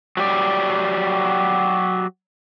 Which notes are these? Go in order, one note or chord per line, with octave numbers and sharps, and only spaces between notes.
F#3 G4 D5